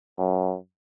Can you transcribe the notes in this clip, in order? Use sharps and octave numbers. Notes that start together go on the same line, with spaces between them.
F#2